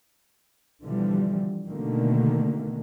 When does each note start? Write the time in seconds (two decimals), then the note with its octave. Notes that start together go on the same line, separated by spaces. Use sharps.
0.84 B2 D3 E3 F3 G3
1.69 B2 D3 D#3 A3 A#3